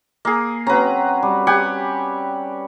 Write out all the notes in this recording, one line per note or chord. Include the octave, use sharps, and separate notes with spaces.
A#3 G#4
F#3 C4 C#4 B4 A#5
G3
G4 F#5 G#5